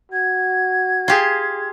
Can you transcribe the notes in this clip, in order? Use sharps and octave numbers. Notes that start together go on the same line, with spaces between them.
F#4 G#6
F4 G4 G#4